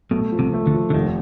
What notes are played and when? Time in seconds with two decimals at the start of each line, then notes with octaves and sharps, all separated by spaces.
0.11 B1 B2 A3
0.32 F3
0.39 C2 C3
0.54 A3
0.66 D2 D3
0.74 F3
0.90 D3
0.94 F1 D#2 D#3